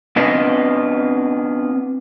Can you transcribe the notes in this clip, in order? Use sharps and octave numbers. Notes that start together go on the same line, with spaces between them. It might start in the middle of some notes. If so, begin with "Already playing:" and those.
B3 C4 D4 F4 B4 D#5